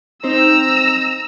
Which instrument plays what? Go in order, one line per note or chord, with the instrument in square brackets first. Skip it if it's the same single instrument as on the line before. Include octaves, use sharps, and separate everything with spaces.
[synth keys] C4 D#4 C5 [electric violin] A#5 E6